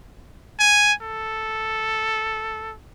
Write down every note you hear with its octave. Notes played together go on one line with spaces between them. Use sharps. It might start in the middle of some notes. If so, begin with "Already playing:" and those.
G#5
A4